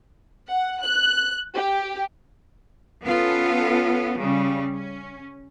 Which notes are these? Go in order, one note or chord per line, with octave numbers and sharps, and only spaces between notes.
F#5
F#6
G4
B3 C#4 F4 A4
C#3 G3
C#4